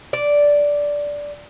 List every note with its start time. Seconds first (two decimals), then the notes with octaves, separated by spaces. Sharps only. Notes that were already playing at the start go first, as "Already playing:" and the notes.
0.13 D5